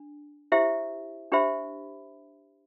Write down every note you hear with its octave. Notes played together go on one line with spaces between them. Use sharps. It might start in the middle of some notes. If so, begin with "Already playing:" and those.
Already playing: D4
E4 G4 C5 E5
D4 G4 C5 E5 B5